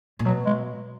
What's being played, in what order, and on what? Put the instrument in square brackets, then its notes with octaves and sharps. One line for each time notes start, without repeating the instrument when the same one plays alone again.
[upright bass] A#2
[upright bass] B2 [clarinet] F#3
[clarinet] G#3